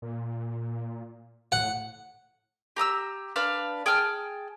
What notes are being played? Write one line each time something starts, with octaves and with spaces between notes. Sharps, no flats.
A#2
A2 F#5
G4 A#5 D#6 E6
D4 B4 F5 F6
G#4 G5 A5 F6